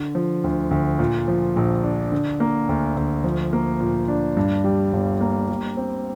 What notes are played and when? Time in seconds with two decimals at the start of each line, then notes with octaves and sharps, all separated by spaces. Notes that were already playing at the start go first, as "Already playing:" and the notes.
Already playing: D3
0.15 F3
0.44 D2
0.71 D2
0.99 A#2
1.28 F3
1.56 A#1
1.84 D4
2.12 D3
2.40 A#3
2.69 D2
2.96 D2
3.24 F3
3.53 A#3
3.80 A#2
4.08 D4
4.37 G2
4.64 G3
4.93 G1
5.21 A#3
5.49 G3
5.77 C4